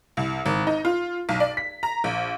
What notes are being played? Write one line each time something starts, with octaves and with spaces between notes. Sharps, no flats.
C2
G#1
D#4
F4
B1
D5
B6
A#5
A#1